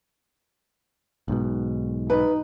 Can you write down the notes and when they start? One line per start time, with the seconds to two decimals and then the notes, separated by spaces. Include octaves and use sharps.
1.28 B1 G#2 B2
2.10 D#4 B4